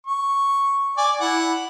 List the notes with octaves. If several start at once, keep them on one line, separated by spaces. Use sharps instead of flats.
C#6
D5 G#5
E4 F#5